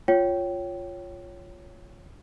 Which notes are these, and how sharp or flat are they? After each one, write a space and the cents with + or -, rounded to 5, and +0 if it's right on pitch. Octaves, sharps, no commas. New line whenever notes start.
F4 +0 C#5 +0 G5 -15